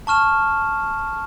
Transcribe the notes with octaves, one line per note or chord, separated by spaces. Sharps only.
A5 C#6 F6 E7